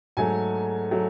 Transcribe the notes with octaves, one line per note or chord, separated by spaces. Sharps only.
G#2 F#3 A3 G#5
F#3 A3